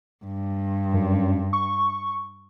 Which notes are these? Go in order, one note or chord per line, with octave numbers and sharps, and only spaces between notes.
G2
F#2
C#6